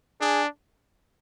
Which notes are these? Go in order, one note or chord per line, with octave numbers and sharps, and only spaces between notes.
D4 G#4